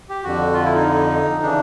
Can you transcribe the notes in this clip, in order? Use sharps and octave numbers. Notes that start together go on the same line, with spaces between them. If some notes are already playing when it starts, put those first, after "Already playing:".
G4
F2 D3 F#4
F4
E4
D#4
C#3 E3 D4